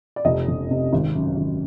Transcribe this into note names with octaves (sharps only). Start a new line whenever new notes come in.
D5
F1 D#5
F1
C3
G#1
F#2
G#1